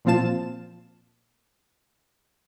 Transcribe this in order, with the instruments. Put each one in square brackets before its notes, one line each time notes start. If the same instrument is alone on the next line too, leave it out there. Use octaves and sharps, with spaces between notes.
[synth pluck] A#2 F3 C4 F4 A5 E7